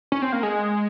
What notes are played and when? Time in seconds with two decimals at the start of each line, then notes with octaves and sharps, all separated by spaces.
0.12 C#4
0.22 C4
0.33 A#3
0.43 G#3